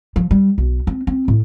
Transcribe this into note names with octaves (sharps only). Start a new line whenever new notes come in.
F3
G3
B1
C4
C4
A2